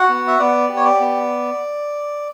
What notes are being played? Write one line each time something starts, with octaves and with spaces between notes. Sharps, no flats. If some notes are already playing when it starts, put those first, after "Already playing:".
Already playing: F#4 F#5
B3
E5
B3 D5
G4
C#5
D5
B3